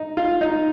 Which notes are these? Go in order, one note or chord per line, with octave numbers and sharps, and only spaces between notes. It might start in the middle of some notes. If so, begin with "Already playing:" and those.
Already playing: D#4
F4
D#4